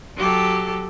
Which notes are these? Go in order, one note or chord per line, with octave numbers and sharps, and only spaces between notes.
F#3 G4 A4